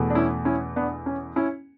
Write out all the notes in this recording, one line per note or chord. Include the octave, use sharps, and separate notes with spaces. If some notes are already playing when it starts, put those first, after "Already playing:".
Already playing: E2 B2 A3
D4
C#4 E4
C#4 E4
B3 D4
C#4
C#4 E4